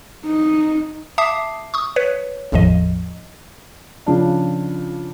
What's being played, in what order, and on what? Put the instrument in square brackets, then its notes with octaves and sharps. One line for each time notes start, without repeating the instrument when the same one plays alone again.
[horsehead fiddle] D#4
[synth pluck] E5 A5 D6 D#6 C7
C#6 D#6
B4 C#5
G#1 E2 A2 F3 D#5
[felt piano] C#3 F3 D4